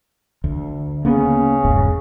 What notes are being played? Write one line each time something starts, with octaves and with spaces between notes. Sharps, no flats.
D2
C#3 A#3 B3 C#4
E1 C#2 G#2